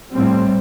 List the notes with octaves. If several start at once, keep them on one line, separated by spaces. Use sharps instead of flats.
A2 G3 C4